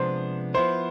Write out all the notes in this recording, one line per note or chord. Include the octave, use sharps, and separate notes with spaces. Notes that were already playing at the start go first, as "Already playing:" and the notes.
Already playing: C3 F3 G#3 B3 D4 C5
F3 B3 E4 C5